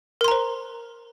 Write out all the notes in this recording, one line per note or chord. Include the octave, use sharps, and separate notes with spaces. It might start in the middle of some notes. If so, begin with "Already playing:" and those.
A#4 C5 A#5 C6